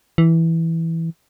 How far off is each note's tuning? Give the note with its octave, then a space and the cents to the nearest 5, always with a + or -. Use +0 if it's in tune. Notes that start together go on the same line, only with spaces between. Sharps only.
E3 -5